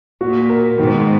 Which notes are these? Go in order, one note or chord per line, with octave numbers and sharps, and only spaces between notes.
A#2 F#4
A#4
G#2 B2 D#3